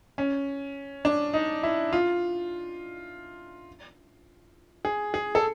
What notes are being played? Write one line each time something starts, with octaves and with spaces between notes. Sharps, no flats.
C#4
D4
D#4
E4
F4
G#4
G#4
A4